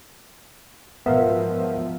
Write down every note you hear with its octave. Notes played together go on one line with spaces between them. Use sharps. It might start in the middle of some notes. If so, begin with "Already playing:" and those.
G#2 B2 F3 B3 A#4 E5 F5